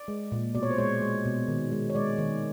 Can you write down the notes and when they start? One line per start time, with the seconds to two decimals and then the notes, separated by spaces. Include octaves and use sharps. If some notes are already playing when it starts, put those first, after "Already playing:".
Already playing: D5
0.08 G#3
0.32 A#2
0.55 B2 D5
0.63 C#5
0.71 C5
0.78 G#3 C#5
1.02 G#3
1.25 B2
1.48 D#3
1.72 G#3
1.90 C#5
1.95 G#3 D5
2.18 D#3